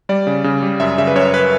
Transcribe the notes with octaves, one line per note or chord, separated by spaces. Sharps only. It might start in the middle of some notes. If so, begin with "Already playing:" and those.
G3 D5
C#3
C#3
G3
F#2 E5
C#3 E5
B4
F#2 C#5
B4